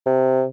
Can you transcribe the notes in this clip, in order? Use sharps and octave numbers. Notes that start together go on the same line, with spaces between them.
C3